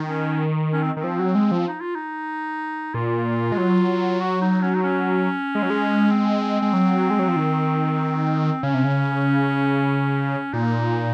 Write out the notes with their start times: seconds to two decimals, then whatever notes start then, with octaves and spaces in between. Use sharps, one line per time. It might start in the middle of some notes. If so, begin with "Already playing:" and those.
Already playing: D#3
0.09 C#4
0.73 C#4
0.82 C4
0.97 D#3
1.01 F3 C4
1.19 F#3
1.35 G#3
1.51 F3
1.68 D#4
1.80 F4
1.95 D#4
2.94 A#2 F4
3.52 G#3
3.58 F#3
4.21 F#4
4.42 D#4
4.63 C#4
4.75 D#4
4.83 C#4
5.55 G#3
5.63 F#3
5.70 G#3
6.10 C4
6.62 G#3
6.73 F#3
7.10 G#3
7.19 F#3
7.28 F3
7.36 D#3
8.63 C#3 C#4
8.74 C3
8.84 C#3
10.53 A#2 D#4